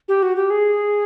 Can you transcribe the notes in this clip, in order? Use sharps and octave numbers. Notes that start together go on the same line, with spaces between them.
G4
F#4
G4
G#4